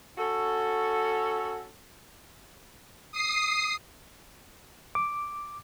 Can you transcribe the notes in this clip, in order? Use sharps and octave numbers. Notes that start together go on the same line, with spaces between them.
C#4 F#4 A4
D#6 C7
D6